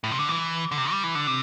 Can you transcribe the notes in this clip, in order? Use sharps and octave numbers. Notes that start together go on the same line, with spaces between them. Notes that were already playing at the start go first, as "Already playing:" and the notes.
A2
C3
D3
E3
D3
C3
G3
E3
D3
C3